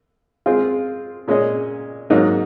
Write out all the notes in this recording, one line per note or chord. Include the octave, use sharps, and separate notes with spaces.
G#3 C4 F4 G#4
A#2 G#3 C#4 G#4 D#5
G#2 F#3 A#3 D#4